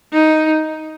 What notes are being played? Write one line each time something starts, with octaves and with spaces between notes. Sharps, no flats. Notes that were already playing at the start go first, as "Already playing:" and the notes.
D#4